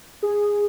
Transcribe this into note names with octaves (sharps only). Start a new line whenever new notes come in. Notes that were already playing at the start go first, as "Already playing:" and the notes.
G#4